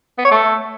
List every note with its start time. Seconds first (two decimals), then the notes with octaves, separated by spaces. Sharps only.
0.18 B3
0.25 C#5
0.31 A3